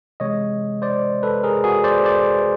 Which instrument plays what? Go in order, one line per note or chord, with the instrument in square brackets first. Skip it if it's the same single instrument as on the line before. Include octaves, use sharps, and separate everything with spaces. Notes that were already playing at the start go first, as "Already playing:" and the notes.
[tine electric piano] C3 E3 G#3 C#5 D#5
C5 D5
A4 B4
G#4 A#4
F#4 G#4
C5 D5
C5 D5